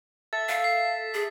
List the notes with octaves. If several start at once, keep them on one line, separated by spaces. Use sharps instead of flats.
A4 E5 A6
F5
C7
G#4